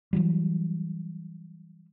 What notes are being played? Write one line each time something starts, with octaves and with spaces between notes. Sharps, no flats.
E3 F#3 G3